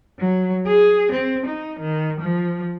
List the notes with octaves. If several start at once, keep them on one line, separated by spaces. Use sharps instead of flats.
F#3
G#4
C4
D#4
D#3
F3